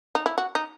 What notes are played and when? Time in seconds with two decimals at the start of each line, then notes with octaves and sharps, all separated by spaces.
0.15 D#4
0.26 E4
0.38 F#4
0.55 D#4